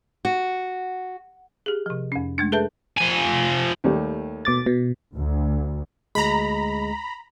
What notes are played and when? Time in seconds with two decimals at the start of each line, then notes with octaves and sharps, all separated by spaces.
0.25 F#4
1.66 G4 G#4
1.86 C3 F3
2.12 F2 C#4
2.38 G#3 A3 D4
2.52 G#4 A4 B4 E5 A5 G6
2.97 F3 G#5
3.84 D#2 G3 A3
4.45 B2 D6 A6
4.66 B2
5.15 D2
6.15 D2 G#3 A#5 B5